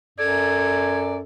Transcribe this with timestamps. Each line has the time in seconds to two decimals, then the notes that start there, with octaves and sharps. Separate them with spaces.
0.18 F#2 A4 D5 G#6